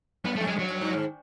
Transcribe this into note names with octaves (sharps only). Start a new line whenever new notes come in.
F#2 B3
A3
F2
G#3
F#2 F#3
F#2
G2
G#2